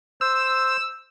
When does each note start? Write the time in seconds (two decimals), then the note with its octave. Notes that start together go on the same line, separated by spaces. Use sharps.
0.21 C5 E6